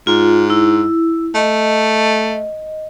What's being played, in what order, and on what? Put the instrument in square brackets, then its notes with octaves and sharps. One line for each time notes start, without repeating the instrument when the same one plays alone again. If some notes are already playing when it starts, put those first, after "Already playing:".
[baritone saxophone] G#2 [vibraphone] F4
[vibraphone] E4
[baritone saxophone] A3 [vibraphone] D#5